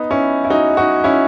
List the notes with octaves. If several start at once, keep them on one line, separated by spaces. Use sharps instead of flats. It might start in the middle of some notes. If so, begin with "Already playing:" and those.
Already playing: B3 D#4
C#4 E4
E4
D#4 F#4
D#4 F#4
C#4 E4